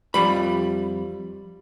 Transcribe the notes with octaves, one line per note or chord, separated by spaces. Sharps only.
F2 G3 B5